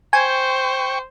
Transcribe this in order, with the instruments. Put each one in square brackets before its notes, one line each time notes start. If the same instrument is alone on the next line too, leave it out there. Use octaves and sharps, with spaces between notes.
[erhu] C5 [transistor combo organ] G5 C#6 [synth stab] G#5